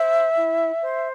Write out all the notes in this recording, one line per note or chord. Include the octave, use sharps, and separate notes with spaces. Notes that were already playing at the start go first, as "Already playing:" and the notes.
Already playing: C5 E5
E4
C5